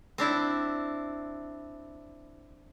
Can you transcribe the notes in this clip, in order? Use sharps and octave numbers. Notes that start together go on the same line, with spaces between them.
C4 D4 E4